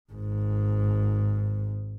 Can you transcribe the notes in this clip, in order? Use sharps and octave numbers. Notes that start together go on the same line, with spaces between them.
G#1 G#2